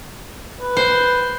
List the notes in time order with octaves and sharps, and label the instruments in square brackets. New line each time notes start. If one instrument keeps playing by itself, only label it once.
[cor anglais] B4
[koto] C5